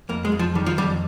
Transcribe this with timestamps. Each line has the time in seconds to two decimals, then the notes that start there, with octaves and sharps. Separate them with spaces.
0.09 F2 A#3
0.25 G#3
0.32 F2
0.39 F3
0.55 D#3 G3
0.66 F3
0.78 F2 G3